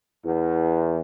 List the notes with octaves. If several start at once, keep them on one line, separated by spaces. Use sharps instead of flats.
E2